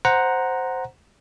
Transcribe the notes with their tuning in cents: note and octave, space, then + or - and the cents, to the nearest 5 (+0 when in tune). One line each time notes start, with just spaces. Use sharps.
C5 +0 F#5 +0 A#5 +0